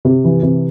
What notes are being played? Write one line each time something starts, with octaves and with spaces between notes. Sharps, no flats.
C3
E3
C3